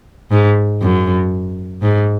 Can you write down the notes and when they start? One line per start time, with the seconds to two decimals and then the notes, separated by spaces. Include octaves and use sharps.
0.31 G#2
0.81 F#2
1.83 G#2